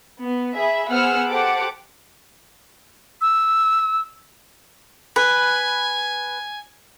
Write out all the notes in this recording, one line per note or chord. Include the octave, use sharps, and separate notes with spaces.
B3
G#4 E5 B5
B3 G#4 C5 F#5 E6 F6
G4 A4 C5 F#5 D6
E6
B4 G#5